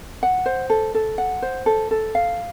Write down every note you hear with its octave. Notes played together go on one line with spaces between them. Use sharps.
F#5
C5
A4
A4
F#5
C5
A4
A4
F5